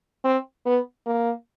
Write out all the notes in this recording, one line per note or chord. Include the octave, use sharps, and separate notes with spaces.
C4
B3
A#3